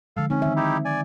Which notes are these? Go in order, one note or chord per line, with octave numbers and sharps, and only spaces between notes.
D3 F3 G#3 A4 F5
C4 C#4 D#4
D#3 E5
D#4 E4 G4
D5 G#5